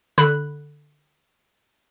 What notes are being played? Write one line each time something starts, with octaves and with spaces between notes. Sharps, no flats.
D3 B5 F#6